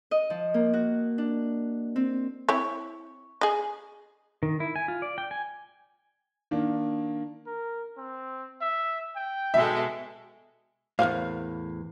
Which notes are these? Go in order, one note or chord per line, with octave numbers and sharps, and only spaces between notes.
D#5
F3
A#3
F#4
D4
C4
C4 E4 C#5 C#6
G#4 D#5
D#3
E4
G#5
F4
D5
G5
G#5
D#3 A#3 D4
A#4
C4
E5
G5
B2 G#3 A4 E5
E2 A2 A#4 C5 F5